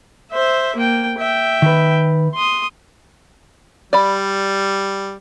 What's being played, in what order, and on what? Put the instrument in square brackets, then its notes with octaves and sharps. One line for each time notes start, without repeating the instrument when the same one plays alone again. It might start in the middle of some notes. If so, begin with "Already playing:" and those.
[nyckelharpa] C5 E5
A#3 G5
E5 G5
[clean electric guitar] D#3 B4
[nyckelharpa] C6 D#6
[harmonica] G3 [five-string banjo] D5 B5